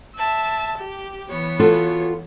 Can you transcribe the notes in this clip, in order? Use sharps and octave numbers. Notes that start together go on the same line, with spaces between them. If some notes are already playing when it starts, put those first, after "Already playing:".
E5 A5
G4
E3 B3 C#5
F4 F#4 A4